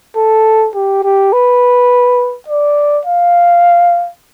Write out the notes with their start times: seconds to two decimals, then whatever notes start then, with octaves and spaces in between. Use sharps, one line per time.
0.16 A4
0.75 G4
1.04 G4
1.32 B4
2.48 D5
3.05 F5